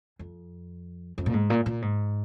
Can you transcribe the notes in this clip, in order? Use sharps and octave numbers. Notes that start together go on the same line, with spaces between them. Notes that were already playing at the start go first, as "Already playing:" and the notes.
F2
F2
A#2
G#2
A#2
A#2
G#2